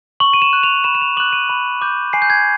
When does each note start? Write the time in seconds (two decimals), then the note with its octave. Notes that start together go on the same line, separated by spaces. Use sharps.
0.20 C#6 F#7
0.34 D#7
0.42 E7
0.53 F#6
0.63 F7
0.84 B5 E7
0.95 E7
1.02 F7
1.17 D6 F#6 F#7
1.33 D#7
1.50 B5
1.82 D6 G6
2.13 G#5 C7
2.22 G6
2.30 G#6